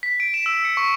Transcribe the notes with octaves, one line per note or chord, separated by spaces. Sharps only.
B6
D7
E7
E6
C#7
C#6